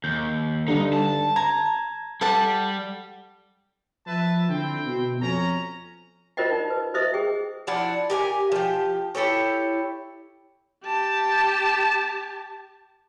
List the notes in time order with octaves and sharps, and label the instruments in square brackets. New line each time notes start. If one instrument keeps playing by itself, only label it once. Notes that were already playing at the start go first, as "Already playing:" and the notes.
[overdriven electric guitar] D#2 [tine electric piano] G6
[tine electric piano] D3 G3 [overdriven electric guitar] D#4
[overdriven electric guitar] A5
[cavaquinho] A#5 [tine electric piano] G#6
[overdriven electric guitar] G3 [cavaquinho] A4 F#5 A5
[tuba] F3 [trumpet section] B4 E5 A5
[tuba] D3 [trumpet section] C4 E4 G5
[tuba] B2
[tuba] F2 [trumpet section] C#4 A#5
[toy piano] F4 A#4 C5 D5 D#5 G5
D#4
B4
B4 C5 D#5 E5 D#6
G#4 G5
[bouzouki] F3 D4 E4 F#5
G4 A#4 F5 G#5
F3 G4
E4 G4 A4 C#5
[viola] G4 A5